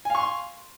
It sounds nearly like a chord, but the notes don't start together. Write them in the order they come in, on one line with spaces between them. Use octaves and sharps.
G#5 F5 C#6 C6